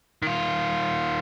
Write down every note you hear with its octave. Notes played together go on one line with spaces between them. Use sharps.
D#3 F4